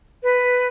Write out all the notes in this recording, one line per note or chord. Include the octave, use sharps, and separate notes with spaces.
B4